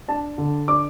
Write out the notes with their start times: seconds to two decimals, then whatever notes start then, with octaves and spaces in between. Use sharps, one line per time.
0.08 D4 A5
0.38 D3
0.68 D4 D6